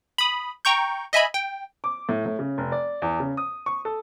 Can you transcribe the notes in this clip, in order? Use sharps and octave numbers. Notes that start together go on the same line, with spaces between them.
B5 D#6
G5 A#5 C#6 G6
D#5 E5 G#5 B5
G5
D6
A2
A2
C#3
F1
D5
E2
C#3
D#6
C#6
A4